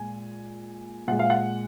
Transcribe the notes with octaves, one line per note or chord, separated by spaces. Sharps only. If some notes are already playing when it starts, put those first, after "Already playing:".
Already playing: A#2 G#3 G#5
A#2 G#3 F#5
F5
F#5